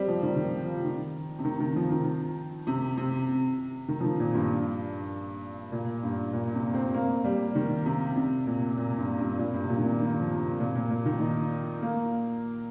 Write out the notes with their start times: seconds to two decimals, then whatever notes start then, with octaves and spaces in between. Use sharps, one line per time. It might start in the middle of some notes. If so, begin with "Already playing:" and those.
Already playing: G3 C4
0.08 F3
0.23 D#3
0.36 D#3
0.43 F3
0.64 F3
0.85 D#3
1.39 C3
1.45 D#3
1.60 D#3
1.76 F3
1.90 D#3
2.67 C3
2.98 C3
3.88 D#3
4.00 F3
4.04 D#3
4.20 A#2
4.35 G2
5.72 A#2
6.03 G2
6.33 A#2
6.54 C3
6.74 C4
6.94 A#3
7.24 G3
7.55 D#3
7.85 C3
8.16 C3
8.47 A#2
8.77 A#2
8.98 G2
9.18 G2
9.38 A#2
9.53 G2
9.64 C3
9.69 A#2
9.78 D#3
9.84 C3
9.99 D#3
10.19 F3
10.40 C3
10.60 A#2
10.75 A#2
10.90 A#2
11.06 D#3
11.21 D#4
11.82 A#3